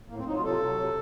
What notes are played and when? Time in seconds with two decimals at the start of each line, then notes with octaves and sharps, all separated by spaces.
0.09 A2 A#3
0.18 C4
0.26 F#3 D#4
0.36 F4
0.44 C3 A4
0.61 F#3
0.78 C3